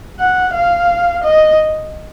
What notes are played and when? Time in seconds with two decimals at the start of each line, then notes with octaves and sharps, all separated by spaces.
0.20 F#5
0.54 F5
1.24 D#5